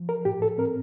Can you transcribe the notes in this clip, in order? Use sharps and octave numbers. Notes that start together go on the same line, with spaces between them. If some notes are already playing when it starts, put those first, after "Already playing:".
Already playing: F3
A#4
A2 G4
A4
C4 A#4